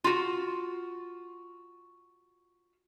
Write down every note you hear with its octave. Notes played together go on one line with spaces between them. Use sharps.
F4 F#4